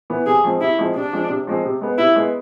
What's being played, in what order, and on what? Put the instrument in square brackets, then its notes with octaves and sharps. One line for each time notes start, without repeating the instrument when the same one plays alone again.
[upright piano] E3 B3
[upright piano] C3 [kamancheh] G#4
[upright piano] F3 G#3 C4
[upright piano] C3 [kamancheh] E4
[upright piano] F3 G#3 C4
[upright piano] C3 [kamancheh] D4
[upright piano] F3 G#3 C4
C3
F3 G#3 C4
C3
G#3 B3
[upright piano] C3 [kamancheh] E4
[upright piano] G#3 B3